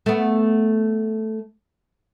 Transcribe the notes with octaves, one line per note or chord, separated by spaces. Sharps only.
A3 B3